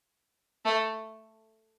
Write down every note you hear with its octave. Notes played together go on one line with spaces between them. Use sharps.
A3